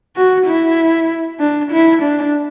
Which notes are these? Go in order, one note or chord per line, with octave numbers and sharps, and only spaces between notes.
F#4
E4
D4
E4
D4